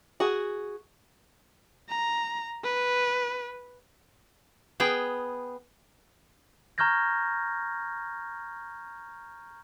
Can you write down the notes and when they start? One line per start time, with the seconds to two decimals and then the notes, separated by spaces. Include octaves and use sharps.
0.20 F#4 G#4
1.89 A#5
2.64 B4
4.80 B3 G#4 G5
6.78 A#5 C#6 F6 G6 G#6 A#6